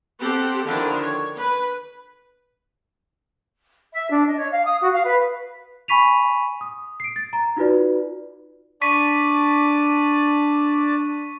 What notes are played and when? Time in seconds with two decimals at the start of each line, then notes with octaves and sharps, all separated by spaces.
0.19 C4 G4 A4 F#5 C6
0.65 D3 D#3 F3 D4 E4
1.01 C#5
1.36 B4
3.93 E5
4.11 D4
4.26 D#5
4.37 C#5
4.52 F5
4.65 D#6
4.81 F#4
4.92 F5
5.04 B4
5.88 G#5 B5 C#6 B6 D#7 F7
6.61 D#6
7.00 C7 D7
7.16 A6
7.33 A#5
7.57 D#4 F4 F#4 B4 D5
8.82 D4 D5 A5 C#6 B6 D#7